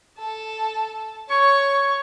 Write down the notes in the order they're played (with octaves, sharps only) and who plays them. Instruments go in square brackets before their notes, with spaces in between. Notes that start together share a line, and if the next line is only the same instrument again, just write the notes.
[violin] A4
[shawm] C#5 [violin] C#6